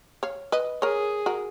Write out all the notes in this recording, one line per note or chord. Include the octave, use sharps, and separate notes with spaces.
C#5 F5
B4 D#5
G#4 A#4 C#5
F#4 A#4